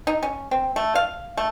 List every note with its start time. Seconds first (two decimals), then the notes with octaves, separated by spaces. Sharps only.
0.07 D#4
0.23 C#4
0.51 C4
0.76 A3
0.95 F5
1.37 A3